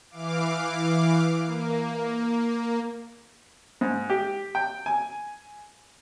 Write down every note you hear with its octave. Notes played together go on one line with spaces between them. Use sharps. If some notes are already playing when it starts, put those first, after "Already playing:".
E3 F5 D6
A#3
G#2
G4
G5
G#5